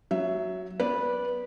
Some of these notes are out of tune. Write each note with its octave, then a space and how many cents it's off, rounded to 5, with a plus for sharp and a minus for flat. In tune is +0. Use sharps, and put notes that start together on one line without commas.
F#3 +0 E5 +0
B3 +0 B4 -15 D5 -15